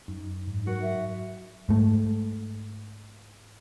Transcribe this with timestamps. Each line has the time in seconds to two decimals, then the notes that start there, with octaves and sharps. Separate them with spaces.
0.08 F#2 D#4
0.47 G#2
0.67 F#3 F#4 A#4
0.82 E5
1.69 G#2 A3